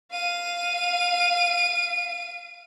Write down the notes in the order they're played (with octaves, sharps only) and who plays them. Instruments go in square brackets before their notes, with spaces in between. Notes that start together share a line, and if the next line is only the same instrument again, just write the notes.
[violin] F5 D#7